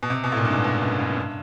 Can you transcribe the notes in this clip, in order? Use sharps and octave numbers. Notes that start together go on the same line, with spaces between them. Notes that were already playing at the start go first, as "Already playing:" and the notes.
B2
C3
B2
A2
A#2
G2
G#2
B2
F#2
F#2
G2